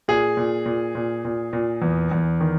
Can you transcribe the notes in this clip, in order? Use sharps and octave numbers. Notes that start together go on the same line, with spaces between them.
A#2 G#4
A#2
A#2
A#2
A#2
A#2
E2
E2
D#3